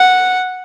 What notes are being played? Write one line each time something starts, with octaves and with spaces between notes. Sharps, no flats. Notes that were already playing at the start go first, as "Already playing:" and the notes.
Already playing: F#5